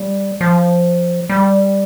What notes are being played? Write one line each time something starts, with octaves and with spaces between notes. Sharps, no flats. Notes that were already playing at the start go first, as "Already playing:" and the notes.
Already playing: G3
F3
G3